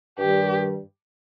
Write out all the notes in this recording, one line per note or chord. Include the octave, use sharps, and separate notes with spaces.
G2 D#3 G3 G4